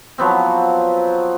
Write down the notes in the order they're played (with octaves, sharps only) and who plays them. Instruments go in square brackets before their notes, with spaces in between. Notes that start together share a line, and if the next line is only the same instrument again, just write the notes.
[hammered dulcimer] F3 F#3 B3 C4